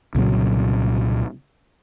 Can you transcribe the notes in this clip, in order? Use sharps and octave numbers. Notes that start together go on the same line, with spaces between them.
C2 A#2 C#3 F#3